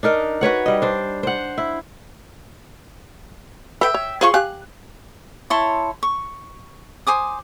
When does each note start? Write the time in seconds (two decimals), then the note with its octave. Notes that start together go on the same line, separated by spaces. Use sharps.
0.03 D4 D#4 A#4 D#5
0.41 F#4 B4 C#5 F#5
0.66 G3 D#5
0.82 D4 C5
1.23 C5 F#5
1.58 E4
3.81 A4 B4 E5 G5
3.94 C#5
4.21 F4 G#4 C5 C6 C#6
4.34 G4 F5 G#5 F#6
5.50 E4 C#5 A5 C6
6.03 C#6
7.07 C5 G#5 D6 D#6